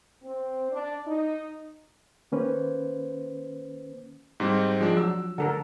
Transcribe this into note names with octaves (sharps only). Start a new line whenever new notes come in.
C4
D4
D#4
D#3 A#3 C#4 B4 C5
G#2 G3 C4
F3 G#3 D4
F#3 E6
D3 A4 A#4